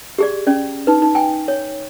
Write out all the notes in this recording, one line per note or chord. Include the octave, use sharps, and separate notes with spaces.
G4 G#4 D5
C#4 D5
D#4 B4
D#4
G5 G#5
C#5